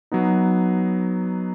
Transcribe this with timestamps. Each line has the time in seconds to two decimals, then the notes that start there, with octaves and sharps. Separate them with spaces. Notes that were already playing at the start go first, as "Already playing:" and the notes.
0.12 F#3 B3 D#4